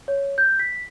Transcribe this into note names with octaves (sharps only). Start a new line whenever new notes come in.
C#5
G6
B6